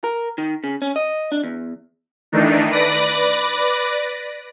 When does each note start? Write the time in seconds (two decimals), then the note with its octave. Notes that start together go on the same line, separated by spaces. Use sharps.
0.04 A#4
0.38 D#3
0.64 C#3
0.82 C#4
0.96 D#5
1.32 D4
1.44 E2
2.32 D#3 E3 A3 D4 D#4
2.70 B4 D5 A#6